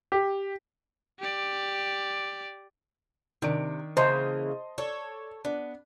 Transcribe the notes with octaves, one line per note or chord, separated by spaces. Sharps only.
G4
G4 D5
C3 D#3 D4 D7
C#3 E3 A#3 C5 D#5 A5 C6
A4 C#5 D5
B3 D4